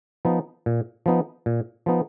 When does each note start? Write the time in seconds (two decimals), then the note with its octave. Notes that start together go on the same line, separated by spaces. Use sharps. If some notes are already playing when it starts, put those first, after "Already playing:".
0.25 F3 B3 D#4
0.66 A#2
1.06 F3 B3 D#4
1.46 A#2
1.86 F3 B3 D#4